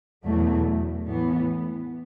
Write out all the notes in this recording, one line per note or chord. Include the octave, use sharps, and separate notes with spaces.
E2 B2 F#3 A3
A2 E3 B3